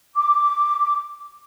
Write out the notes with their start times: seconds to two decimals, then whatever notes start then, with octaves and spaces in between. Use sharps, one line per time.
0.15 D6